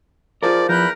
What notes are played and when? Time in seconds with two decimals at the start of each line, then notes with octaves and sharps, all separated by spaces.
0.43 F3 F4 G#4 A#4 D5
0.69 E2 F3 F4 A#4 B5 F#6 G6